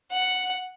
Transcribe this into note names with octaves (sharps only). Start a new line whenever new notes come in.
F#5